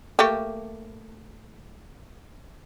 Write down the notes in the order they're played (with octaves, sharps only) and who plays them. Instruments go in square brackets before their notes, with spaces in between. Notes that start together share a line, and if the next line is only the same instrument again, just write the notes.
[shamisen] A3 A#3 G4